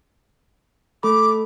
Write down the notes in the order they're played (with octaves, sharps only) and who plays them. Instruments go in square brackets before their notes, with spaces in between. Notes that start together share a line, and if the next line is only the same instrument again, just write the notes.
[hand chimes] A3 A4 B5 [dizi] D6